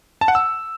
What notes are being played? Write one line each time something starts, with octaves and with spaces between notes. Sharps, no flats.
A5
F#5
E6